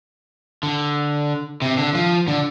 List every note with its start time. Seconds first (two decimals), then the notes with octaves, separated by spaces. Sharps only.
0.63 D3
1.62 C3
1.78 D3
1.95 F3
2.28 D3